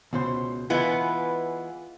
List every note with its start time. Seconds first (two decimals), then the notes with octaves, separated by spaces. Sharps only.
0.13 C#2 B2 C5
0.70 E3 G#3 B3 F4